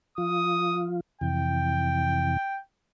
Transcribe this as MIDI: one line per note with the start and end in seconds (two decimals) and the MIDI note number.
0.18 1.00 53
0.18 1.00 65
0.18 0.86 87
1.21 2.37 41
1.21 2.37 48
1.21 2.37 52
1.21 2.59 79